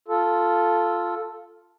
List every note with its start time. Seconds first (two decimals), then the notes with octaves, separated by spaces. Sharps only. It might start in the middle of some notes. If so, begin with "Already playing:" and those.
0.08 F4 A4